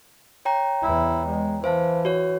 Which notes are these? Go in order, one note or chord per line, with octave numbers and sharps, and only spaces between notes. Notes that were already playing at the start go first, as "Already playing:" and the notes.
C#5 G5 A#5
E2 E4
G#3
E3 C5 F5 A5
F#4 C#5